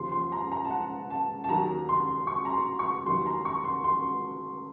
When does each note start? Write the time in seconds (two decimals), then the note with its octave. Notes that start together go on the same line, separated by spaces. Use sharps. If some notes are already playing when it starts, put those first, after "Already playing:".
Already playing: D#2 C#3 F3 C6
0.12 C6
0.32 A#5
0.52 A#5
0.65 A5
0.70 F#5
1.10 A5
1.44 A5
1.49 D#2 D#3 F#3 A#5
1.89 C6
2.27 C#6
2.45 A#5
2.53 C6
2.79 C#6
3.06 D#2 D#3 F#3 C6
3.26 A#5
3.45 C#6
3.64 C6
3.84 C6